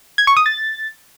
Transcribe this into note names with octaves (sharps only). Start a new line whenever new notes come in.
G#6
C#6
D#6
A6